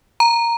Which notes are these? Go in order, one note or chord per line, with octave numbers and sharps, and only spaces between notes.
A#5